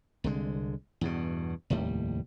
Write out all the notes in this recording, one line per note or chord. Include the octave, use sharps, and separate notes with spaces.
C2 D3 G#3
E2 G2 B2
F1 D#2 A2 G3